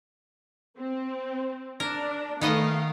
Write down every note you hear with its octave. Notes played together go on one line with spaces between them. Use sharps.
C4
D4 A#4
D#3 A3 B3 D#5 F5